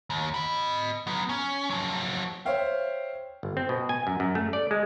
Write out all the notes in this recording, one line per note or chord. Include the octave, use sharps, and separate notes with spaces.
D#2
D#5 B5
F#3 B3
C#4
F3 F#3
C5 C#5 E5 F5 G5
G1
C4
B2
G#5
F#2
F#2
A3
D5
G#3